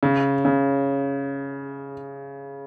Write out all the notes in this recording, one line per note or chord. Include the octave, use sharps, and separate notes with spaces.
C#3
C#3